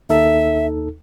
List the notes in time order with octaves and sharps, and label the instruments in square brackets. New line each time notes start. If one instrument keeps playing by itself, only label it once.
[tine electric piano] D#2 D#4 A4 [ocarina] E5